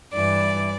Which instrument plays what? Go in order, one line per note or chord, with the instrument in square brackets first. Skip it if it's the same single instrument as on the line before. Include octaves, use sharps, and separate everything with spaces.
[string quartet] G2 E3 D5